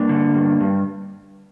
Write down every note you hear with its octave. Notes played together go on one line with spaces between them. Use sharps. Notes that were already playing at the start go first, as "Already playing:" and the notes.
Already playing: G2 A#3 D4
D3
G2
G2